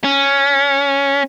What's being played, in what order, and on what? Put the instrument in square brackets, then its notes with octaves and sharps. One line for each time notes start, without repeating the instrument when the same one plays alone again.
[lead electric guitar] C#4